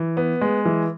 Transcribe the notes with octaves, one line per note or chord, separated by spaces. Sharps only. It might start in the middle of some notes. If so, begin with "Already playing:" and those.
Already playing: E3
B3
G#3
E3